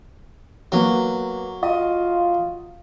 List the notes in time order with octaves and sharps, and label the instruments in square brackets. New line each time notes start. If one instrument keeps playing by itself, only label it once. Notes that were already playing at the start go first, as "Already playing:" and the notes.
[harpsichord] F#3 [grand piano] A#3 B3
[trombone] F4 [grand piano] D#5